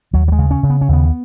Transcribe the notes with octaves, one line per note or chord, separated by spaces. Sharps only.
D#2 F#3
F#3
G#3
C#3
C#4
C#3
B3
C#4
D#2 B3